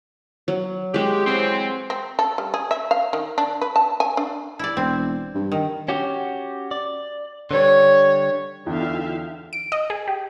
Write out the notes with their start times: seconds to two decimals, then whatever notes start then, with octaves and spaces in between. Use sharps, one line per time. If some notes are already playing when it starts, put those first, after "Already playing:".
0.48 F#3
0.94 G#3 F#4 G4
1.26 E3 F#3 C4
1.90 C4
2.19 A4
2.38 G3
2.54 G#4
2.71 E5
2.91 F5
3.13 D#3
3.38 D4
3.61 B4
3.76 A5
4.00 G#5
4.17 D4
4.59 E4 D5
4.77 E1 C4
5.35 G2
5.52 D#3
5.88 C#4 F#4 G4
6.71 D5
7.51 D3 G3 C#5
8.66 E2 D3 D#4 F4 E5 F5 G5
9.53 D7
9.72 D#5
9.90 G#4
10.08 G4